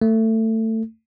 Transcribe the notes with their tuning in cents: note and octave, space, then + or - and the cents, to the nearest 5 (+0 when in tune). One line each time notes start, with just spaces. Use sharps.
A3 +20